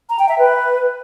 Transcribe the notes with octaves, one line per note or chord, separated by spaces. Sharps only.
A#5
G5
E5
B4